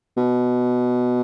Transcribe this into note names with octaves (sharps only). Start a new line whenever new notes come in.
B2